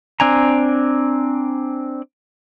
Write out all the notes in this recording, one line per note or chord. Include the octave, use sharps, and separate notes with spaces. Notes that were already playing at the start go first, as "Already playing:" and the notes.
C4 D4 G#5 A#5